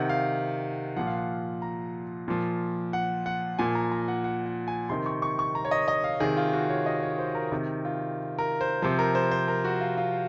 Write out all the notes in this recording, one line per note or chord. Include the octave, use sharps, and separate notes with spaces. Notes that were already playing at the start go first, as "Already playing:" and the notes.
Already playing: C3 D#3 F#5
F5
A#2 F3 F#5
F5
F#5
A#5
A#2 F3
F#5
F#5
A#2 F3 G#5
A#5
A#5
F#5
F#5
F#5
G#5
C3 D#3 C6
C#6
C#6
C#6
A#5
C#5
D#5
D#5
F5
C3 D#3 G#4
F4
F#4
C#5
D#5
C#5
C5
A#4
C3 D#3
F4
A#4
C5
C3 F3 C5
A#4
C5
C5
A#4
F#4
F4
F4